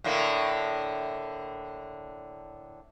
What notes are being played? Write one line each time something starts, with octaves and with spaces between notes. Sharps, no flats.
A2 D3 A#3